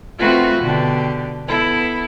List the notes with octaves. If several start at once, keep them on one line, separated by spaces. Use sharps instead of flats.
A3 C4 F4 F#4 B4
B2 D3 D4 G4
B3 E4 A4